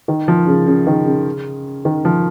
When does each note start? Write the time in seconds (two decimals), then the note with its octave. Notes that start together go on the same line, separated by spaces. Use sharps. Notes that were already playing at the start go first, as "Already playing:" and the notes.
0.08 D#3
0.28 F3
0.47 C#3
0.67 C#3
0.87 D#3
1.06 C#3
1.85 D#3
2.05 F3